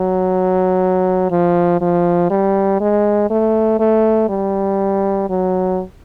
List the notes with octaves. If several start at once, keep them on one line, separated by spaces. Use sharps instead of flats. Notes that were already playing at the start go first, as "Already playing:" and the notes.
Already playing: F#3
F3
F3
G3
G#3
A3
A3
G3
F#3